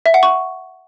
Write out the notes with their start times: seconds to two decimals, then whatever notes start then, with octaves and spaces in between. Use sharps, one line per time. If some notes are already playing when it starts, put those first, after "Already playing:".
0.06 E5
0.14 F#5
0.23 C#6